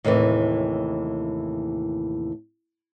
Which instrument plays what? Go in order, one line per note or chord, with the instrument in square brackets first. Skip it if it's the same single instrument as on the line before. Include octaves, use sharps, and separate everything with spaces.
[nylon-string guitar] D#2 A2 C3 D#3 E3